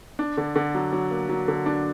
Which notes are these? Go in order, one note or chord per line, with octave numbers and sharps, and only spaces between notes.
D4
D3
D3
F#3
F#3
A#3
F#3
D3
D4